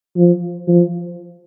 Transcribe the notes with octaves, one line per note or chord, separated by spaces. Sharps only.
F3
F3